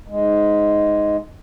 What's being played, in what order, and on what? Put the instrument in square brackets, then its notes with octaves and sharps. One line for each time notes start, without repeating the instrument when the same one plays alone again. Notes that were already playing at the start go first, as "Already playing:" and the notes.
[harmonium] G#2 G#3